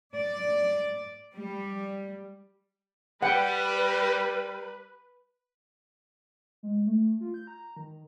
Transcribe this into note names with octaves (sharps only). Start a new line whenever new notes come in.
D5
G3
G3 B4 F#5 G5
G#3
A3
F4
G6
A#5
D#3